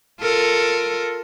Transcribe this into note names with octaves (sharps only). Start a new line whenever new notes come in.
F4 A4 A#4